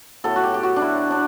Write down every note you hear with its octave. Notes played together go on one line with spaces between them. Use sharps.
A2 F#3 B3 A4
F#4
G4
G4
F#4
D4
E4
D4